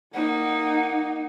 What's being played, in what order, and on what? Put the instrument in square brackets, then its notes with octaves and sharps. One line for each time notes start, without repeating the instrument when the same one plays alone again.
[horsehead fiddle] A#3 D#4 [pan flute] F#5